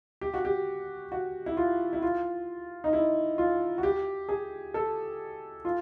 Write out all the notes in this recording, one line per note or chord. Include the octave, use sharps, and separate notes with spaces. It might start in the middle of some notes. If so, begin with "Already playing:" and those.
G4
F#4
G4
F#4
E4
F4
E4
F4
D#4
E4
F4
F#4
G4
G#4
A4
F4